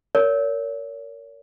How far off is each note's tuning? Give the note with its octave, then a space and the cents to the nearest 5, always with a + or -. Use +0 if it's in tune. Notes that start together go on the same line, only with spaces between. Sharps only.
A#4 -15 C#5 +35